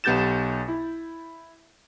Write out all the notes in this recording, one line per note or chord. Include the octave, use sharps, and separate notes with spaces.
B1 B3 G4 G6 A6 E7
E4